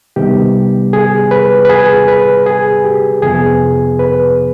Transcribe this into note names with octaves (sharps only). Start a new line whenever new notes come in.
C3 D#3 G3 B3 G4
G#4
B4
B4
G#4
B4
G#4
G4
F2 C3 F3 B3 G#4
B4